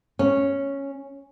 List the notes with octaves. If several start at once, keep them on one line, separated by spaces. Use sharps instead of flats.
C#4